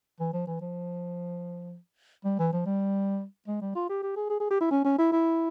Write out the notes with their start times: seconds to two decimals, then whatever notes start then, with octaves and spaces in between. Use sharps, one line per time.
0.20 E3
0.33 F3
0.47 E3
0.61 F3
2.25 G3
2.39 E3
2.53 F3
2.66 G3
3.48 G#3
3.62 G3
3.75 F4
3.89 G4
4.03 G4
4.16 G#4
4.30 G#4
4.40 G#4
4.51 G4
4.60 E4
4.71 C#4
4.85 C#4
4.98 E4
5.12 E4